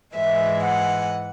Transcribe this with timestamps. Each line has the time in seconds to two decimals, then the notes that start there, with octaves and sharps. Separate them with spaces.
0.16 G#2 E3 G#3 E5
0.63 F#5